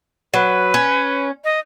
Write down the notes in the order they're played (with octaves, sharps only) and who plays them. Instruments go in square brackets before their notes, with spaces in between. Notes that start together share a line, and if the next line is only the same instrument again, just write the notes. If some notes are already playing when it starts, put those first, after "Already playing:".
[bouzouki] F#3 [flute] B4
[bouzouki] C#4
[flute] D#5